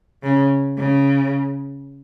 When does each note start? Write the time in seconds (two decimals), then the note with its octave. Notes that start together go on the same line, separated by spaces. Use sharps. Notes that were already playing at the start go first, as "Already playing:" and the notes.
0.23 C#3
0.78 C#3